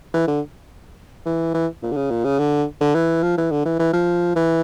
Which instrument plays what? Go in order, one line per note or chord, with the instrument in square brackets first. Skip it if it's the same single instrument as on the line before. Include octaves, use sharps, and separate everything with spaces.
[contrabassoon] E3
D3
E3
E3
A#2
D3
C#3
A#2
C#3
D3
D3
E3
F3
E3
D3
E3
E3
F3
E3